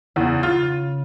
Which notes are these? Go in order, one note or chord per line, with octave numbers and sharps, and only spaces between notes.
E2 C#3
C#3 F4